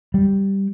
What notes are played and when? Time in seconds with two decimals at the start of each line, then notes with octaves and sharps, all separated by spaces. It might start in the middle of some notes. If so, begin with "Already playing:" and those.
0.14 G3